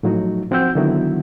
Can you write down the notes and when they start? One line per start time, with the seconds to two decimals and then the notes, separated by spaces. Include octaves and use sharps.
0.03 A2 F3 F#3 D#4 F#4
0.51 F3 C4 F#4 F#5 E6 G6
0.75 D3 D#3 F#3 B3 E4 F#4